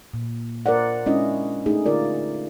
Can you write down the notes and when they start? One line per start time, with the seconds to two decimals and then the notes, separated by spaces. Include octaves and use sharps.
0.14 A#2
0.66 F4 A#4 C5 D5 F#5
1.06 G#3 C#4 D4 E4 D#5
1.66 A3 D#4 G#4
1.86 D3 F4 A#4 D5